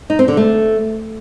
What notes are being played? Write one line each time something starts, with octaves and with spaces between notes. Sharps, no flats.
D#4
C4
D3
A3